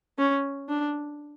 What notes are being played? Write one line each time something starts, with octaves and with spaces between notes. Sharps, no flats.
C#4
D4